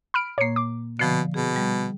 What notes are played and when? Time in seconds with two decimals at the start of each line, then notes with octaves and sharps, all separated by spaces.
0.14 B5 F6 D7
0.38 A#2 A#3 C#5 C7
0.56 D6
0.99 B2 D3 F3 C7
1.34 B2 G#4
1.56 G3